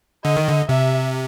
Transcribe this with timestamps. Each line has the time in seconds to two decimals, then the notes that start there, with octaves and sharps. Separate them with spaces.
0.24 D3 D#5
0.36 D#3
0.48 D3
0.68 C3 E5